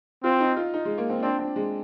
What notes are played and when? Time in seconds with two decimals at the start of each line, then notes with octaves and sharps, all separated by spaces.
0.24 C4 F4
0.40 D#4
0.57 F4
0.74 D#4
0.85 G#3
0.98 A#3
1.10 C4
1.22 C4 D4
1.39 C4
1.56 G#3